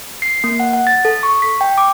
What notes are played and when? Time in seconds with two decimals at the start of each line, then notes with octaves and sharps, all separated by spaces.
0.22 C7
0.44 A#3
0.60 F#5
0.73 F#5
0.87 A6
1.05 A4
1.23 C#6
1.42 B6
1.61 G5
1.78 D6